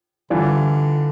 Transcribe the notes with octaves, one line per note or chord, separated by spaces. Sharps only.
D3 E3 G3 D4 F4